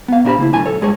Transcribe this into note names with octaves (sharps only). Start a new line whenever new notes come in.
B3 F5
A#2 D4 E4 G4 C5 B5
C#3 A#3 E4
B1 A2 D3 G#5
B1 A4 C#5
G2 G#3 G#4 C#5